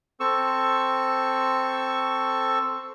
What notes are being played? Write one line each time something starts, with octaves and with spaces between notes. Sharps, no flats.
C4 A4 C#6 E6